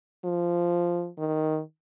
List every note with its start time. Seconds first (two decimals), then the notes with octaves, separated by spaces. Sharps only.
0.24 F3
1.19 D#3